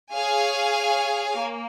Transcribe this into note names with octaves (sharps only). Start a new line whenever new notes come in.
G#4 C#5 F5 G#5
A#3